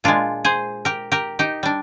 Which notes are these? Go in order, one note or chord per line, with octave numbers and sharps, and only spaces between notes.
A#2 G#3 D4 F4
G#4 C5
G4 A#4
G4 A#4
D#4 G4
G3 D4